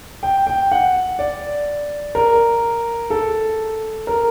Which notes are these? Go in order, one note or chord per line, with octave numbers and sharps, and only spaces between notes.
G5
G5
F#5
D5
A#4
A4
A#4